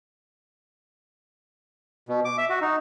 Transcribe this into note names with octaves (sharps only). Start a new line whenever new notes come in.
B2
D6
E5
F#4
D#4